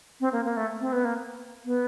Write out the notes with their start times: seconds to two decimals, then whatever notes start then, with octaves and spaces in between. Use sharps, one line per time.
0.20 C4
0.33 A#3
0.45 A#3
0.57 A3
0.81 C4
0.93 B3
1.05 A#3
1.65 B3